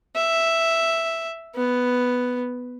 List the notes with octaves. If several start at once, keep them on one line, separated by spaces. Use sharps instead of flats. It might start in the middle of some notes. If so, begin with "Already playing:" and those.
E5
B3